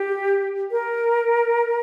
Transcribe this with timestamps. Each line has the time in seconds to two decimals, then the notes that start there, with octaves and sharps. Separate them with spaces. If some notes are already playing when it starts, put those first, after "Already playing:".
Already playing: G4
0.71 A#4